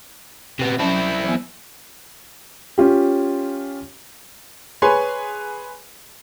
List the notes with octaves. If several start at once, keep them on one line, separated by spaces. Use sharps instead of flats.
C3 B3
F#3 C4 C#4 E4 A5
E3 F#3 B3
C#4 F4 G4
G#4 B4 C#5 G#5 C6